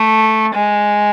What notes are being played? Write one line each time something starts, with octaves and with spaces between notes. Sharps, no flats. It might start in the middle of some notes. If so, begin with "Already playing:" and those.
Already playing: A3
G#3